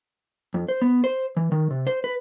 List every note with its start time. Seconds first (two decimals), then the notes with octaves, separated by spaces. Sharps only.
0.54 F2
0.69 C5
0.82 B3
1.04 C5
1.37 E3
1.52 D#3
1.70 C3
1.87 C5
2.04 B4